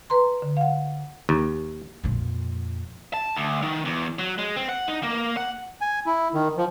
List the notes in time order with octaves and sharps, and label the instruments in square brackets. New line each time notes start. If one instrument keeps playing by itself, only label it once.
[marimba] B4 A#5 C6
D3
F5 F#5
[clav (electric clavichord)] D#2
[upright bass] F2 A#2
[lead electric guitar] A5
D2
D#3
E2
F#3
G#3
C4
F#5
D#4
A#3
F#5
[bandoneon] G#5
E4
D#3
F3